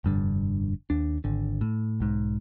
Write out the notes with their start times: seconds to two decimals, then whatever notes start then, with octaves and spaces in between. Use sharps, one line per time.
0.04 F1 G2 D3
0.90 D#2 D4
1.24 G#1 D3
1.61 A2
2.00 B1 G#2